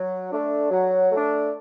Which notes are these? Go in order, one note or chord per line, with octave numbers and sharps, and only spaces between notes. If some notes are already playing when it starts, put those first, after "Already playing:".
Already playing: F#3
A3 D4
F#3
A3 D4